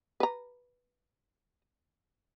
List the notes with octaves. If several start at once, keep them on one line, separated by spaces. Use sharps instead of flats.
B4 A#5